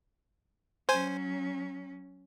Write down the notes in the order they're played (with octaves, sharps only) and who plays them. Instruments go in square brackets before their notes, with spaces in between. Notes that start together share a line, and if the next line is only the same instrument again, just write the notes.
[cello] F#3 C#4 [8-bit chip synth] C5 G#5